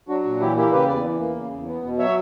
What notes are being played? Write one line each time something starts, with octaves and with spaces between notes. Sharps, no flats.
F#3 D4 F#4
A#2
E3 E4 G4
A#3 E4 G4
C#3 G4 B4
E2 B4 D5
E3
A#3
C#3
E2
B3
B2
F#3 C#5 E5